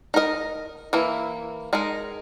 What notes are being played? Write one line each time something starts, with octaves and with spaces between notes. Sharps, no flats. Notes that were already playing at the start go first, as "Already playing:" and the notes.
D#4 A#4 D#5
E3 A#3 E4
G#3 D#4 A#4